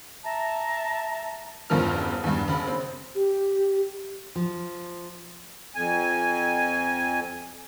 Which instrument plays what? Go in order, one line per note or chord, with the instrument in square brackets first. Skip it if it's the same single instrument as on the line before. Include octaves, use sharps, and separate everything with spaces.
[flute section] E5 A5 A#5
[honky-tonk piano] F#1 E2 G2 F3 A#4 F6
E2 G2
F#1 B5
C4
[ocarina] G4
[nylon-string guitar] F3
[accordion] F2 G#5